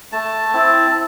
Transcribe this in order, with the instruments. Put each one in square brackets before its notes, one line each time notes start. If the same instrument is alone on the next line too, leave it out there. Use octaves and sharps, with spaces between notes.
[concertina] A3 A5
C4 E4